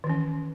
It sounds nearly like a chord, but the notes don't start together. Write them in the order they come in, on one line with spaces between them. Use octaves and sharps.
D#3 E3 C#4